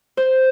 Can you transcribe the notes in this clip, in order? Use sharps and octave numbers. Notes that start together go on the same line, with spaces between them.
C5